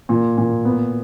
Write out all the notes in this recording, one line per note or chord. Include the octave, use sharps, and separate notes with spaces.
A#2
A#2
B3